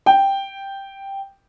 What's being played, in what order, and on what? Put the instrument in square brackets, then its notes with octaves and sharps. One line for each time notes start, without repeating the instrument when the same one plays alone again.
[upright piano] G5